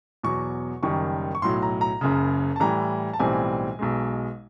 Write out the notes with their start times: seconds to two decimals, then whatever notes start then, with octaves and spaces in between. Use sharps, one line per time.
0.23 E2 B2 F#3 C#6
0.83 F#1 F#2 D#3 G3 C#6
1.35 C#6
1.42 B1 A2 F#3 C6
1.62 A#5
1.81 A#5
2.01 F#1 F#2 C#3
2.56 A5
2.60 A2 E3 G3 A#5
3.13 A5
3.19 B1 A2 E3 G3 C4 G#5
3.79 B1 B2 G#3